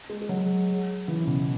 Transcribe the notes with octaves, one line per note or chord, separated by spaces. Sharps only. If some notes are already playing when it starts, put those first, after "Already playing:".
G#3
G#3
F#3
E3
C#3
B2